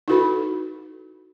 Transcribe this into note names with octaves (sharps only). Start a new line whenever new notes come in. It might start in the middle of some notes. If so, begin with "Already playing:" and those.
D#4 E4 F#4 A4 B4 B5